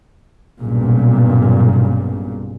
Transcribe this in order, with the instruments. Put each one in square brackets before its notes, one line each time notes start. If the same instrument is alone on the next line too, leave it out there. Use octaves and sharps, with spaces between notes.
[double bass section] B1 G2 A#2 C#3